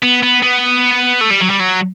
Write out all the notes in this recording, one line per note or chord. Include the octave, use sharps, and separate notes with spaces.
B3
B3
B3
A3
G3
F#3
G3
F#3